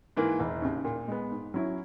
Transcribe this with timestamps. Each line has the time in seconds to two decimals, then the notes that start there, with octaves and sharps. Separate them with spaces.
0.17 G#2 E3 A#3
0.40 E1
0.62 D#2 C#3
0.85 A#2
1.08 G#3 B3
1.32 G#2
1.54 F#3 C#4 E4